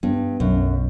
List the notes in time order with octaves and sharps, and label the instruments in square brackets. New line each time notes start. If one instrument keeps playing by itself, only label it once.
[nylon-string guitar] G2 [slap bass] B3
[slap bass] B1 [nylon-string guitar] F#2